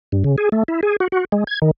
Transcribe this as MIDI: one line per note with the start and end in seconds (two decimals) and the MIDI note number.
0.12 0.23 43
0.24 0.36 49
0.38 0.49 68
0.52 0.63 57
0.68 0.81 64
0.83 0.96 68
1.00 1.08 66
1.12 1.25 66
1.32 1.44 56
1.47 1.59 92
1.62 1.71 51